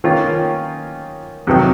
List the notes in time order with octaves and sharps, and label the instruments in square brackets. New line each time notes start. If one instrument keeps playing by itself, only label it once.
[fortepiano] D#3 A#3 C#4 F4 A#4
F2 C3 D#3 F#3